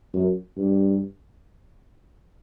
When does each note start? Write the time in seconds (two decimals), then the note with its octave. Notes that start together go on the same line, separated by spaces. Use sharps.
0.14 F#2
0.57 G2